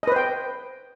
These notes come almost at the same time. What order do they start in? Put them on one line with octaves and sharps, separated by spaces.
D#5 B4 C5 G5